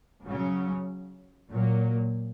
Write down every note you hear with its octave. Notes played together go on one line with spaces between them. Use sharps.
C#3 F#3 C#4
A#2 F#3 A#3